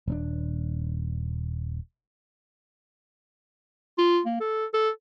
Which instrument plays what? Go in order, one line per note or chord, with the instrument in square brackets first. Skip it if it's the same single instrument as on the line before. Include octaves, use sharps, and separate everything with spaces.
[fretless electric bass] D#1 C4 D4
[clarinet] F4
A#3
A4
A4